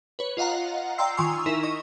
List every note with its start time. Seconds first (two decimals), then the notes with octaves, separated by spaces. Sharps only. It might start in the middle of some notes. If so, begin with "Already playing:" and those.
0.19 B4 C#5
0.37 F4 D#5 F5 F#5 A#5
0.98 D5 G5 A#5 C6 E6 C7
1.17 D#3 F4 G#5 C6 C#6 E6
1.46 D#4 E4 A#4 E5
1.63 D#5 C#6